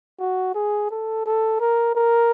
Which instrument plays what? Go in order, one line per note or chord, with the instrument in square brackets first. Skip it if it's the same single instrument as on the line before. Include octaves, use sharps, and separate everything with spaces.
[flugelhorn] F#4
G#4
A4
A4
A#4
A#4